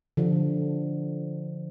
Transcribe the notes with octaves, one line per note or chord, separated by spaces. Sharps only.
D3 F3